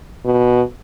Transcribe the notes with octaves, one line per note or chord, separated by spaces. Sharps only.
B2